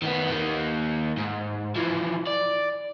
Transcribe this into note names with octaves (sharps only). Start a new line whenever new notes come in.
D#3 B3
D#3 A#3
G#2
E3 F3
D5